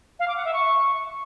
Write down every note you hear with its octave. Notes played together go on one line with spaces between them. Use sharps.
F5
D6
F#5
E5
C#6